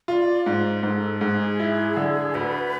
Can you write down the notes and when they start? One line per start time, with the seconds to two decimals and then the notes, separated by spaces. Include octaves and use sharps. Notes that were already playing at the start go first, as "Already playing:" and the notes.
0.08 F4 E5
0.12 D5
0.46 G#2 C5
0.83 G#2 B4
0.88 A4
1.21 G#2 G#4
1.60 E4
1.97 D3
2.34 D2 B4